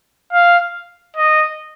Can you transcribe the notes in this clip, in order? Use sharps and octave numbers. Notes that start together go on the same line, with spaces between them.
F5
D#5